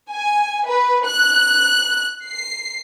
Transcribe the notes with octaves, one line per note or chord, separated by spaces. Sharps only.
G#5
B4
F#6
C7